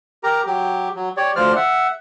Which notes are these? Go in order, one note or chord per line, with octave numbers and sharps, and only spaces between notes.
G4 A#4 A#5
F#3 G4
F#3
G4 C#5 D5
D2 F3 C5 D5 F6
E5 F#5